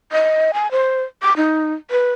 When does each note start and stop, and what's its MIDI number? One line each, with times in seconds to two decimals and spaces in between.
0.12 0.52 75
0.54 0.70 80
0.71 1.03 72
1.22 1.33 86
1.37 1.73 63
1.91 2.13 71